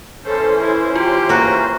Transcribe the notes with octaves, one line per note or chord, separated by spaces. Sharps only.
E3 C#4 A4 C5
E4
F4 G4
A#3 F#4